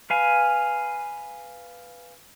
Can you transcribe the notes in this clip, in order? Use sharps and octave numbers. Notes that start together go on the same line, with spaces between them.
B4 F5 G#5